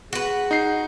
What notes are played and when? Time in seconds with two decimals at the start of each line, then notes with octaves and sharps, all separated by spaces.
0.13 F#4 G#4 B4
0.51 D#4 C7